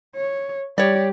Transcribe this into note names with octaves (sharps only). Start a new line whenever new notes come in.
C#5
G3 G4 C#5 D5